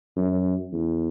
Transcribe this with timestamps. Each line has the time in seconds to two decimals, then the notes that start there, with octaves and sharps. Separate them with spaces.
0.17 F#2
0.72 E2